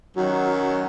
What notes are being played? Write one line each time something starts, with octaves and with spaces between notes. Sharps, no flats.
F#2 D#3 F#3 F#4